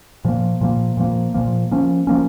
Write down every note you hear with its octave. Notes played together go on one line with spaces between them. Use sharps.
A#2 F3 A#3
A#2 F3 A#3
A#2 F3 A#3
A#2 F3 A#3
F3 A#3 C#4
F3 A#3 C#4